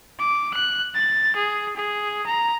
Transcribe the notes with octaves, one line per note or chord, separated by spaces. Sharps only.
D6
F#6
A6
G#4
G#4
A#5